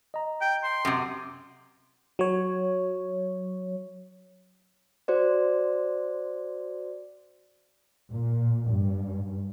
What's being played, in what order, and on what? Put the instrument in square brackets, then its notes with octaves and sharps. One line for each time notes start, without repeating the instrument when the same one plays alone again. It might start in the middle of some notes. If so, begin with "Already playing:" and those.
[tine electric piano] D#5 A#5
[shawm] G5
C6
[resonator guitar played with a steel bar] F#2 C3
[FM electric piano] F#3 C#5
[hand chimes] F#4 C5 D5
[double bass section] A#2
G2